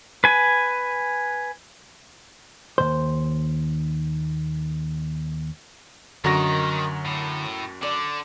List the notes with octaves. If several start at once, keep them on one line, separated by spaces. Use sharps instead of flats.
B4 G#5
D#2 B2 C5
F#2 D3 D#3 F#4 A#4 C#5 A#6
A2
D3 D5